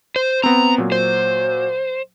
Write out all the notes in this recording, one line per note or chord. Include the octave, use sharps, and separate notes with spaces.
C5
B3 C4 A#5
A#2 F#3
C5